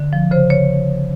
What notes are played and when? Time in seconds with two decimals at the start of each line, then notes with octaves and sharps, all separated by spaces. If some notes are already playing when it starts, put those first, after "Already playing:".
Already playing: D3
0.13 F3
0.31 C#3 C5
0.50 C#5